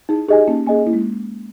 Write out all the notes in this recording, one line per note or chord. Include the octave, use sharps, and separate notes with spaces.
D#4 E4 G#4
D#4 G4 G#4 D#5 G#5
A#3 C#4 D#4
A#3 C#4 G#4 D#5 G#5
A#3 E4
G#3